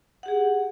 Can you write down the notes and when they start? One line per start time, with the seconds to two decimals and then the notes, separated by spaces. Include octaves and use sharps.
0.23 F#5
0.26 G4
0.28 G#4